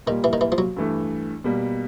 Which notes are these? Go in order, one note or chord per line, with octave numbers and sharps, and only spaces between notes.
A#2 D#3 G3 A#3
E3
D#3
E3
F3
F#3
G2 E3 A3
B2 G3 A#3